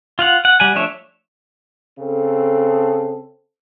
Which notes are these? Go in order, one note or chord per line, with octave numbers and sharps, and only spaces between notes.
F4 F5 F#5
F#5
G3 F#5 G#5
F3 A3 D4 C#5 E5
C#3 C4 A4